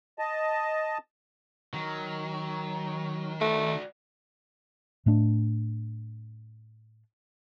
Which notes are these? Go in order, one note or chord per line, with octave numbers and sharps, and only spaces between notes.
D#5 A5
D#3 F#3
A3 F#4 D5
A2 A3 D4